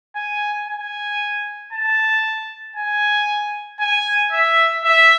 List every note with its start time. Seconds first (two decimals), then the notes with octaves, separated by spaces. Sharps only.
0.16 G#5
0.68 G#5
1.73 A5
2.76 G#5
3.80 G#5
4.32 E5
4.85 E5